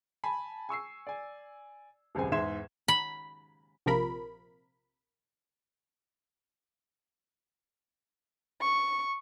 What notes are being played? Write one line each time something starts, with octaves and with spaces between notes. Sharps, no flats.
G#5 A5 B5
G#5 C#6 E6 C7
D5 G#5
D#1 C#2 F#2 C4 G#5
E2 G#2 E5 C6 G#6 E7
B5
A#1 C3 F3 A#4 B5
C#6